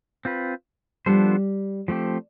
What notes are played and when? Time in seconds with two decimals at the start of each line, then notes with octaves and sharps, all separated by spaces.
0.25 C4 F4 B4
1.06 F3 G3 B3 D4 A4 C5
1.88 F3 A3 C4 G4